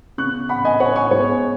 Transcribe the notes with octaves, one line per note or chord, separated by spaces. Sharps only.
C#3 B3 C#6 F#6
F#5 B5
D#5 G#5
C#5 F#5
G#5 C#6
G#2 G#3 B3 C#5